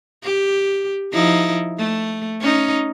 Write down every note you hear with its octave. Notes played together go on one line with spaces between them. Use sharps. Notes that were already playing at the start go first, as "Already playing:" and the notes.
G4
F3 D#4 E4
A3
C#4 D#4